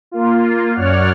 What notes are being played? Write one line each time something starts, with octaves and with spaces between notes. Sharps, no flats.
A#3 F4
F#2 C#5 D5 F#5 F6